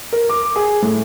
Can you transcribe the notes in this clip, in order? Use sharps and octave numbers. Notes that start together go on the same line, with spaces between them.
A#4
D6
G#4
A2